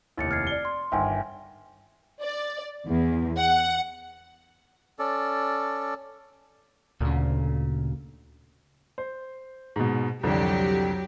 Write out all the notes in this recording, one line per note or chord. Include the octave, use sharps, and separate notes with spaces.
F1 D#2 E4 A6 C#7
F6 G#6 C7
D5 G7
C6
G1 D#3 E5 G5 G#5
D5
E2
F#5
C#4 A4 D5
D2 A#2 C#3
C5
G#2 B2
C2 F2 D3 F#3 G4